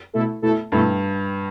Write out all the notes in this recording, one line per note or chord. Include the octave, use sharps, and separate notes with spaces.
B2 A3 E4 A4
B2 A3 E4 A4
G2 B2 A3 E4 A4